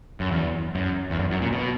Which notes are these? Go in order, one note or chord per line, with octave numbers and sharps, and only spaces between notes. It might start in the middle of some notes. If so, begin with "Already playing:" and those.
F#2
E2
F#2
E2
F#2
F#2
A#2
B2